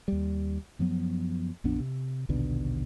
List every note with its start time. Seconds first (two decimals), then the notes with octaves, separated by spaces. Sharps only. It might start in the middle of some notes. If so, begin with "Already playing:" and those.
0.08 D#2 G3
0.79 F#2 F3 F#3 B3
1.64 A#1 F2 B3 D4
1.80 C3
2.29 A#1 D#2 B2 D3